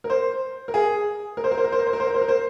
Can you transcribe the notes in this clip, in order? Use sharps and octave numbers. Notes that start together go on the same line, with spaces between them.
A#4
C5
A#4
G#4
A#4
C5
A#4
C5
A#4
C5
A#4
C5
A#4
C5
A#4
C5
A#4
C5